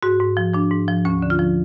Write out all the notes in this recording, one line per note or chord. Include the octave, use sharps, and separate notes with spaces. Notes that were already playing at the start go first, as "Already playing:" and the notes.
G#2 F#4
G#2
F3
F3 D4
G#2
F3
D2 C#4
D3
F4
F3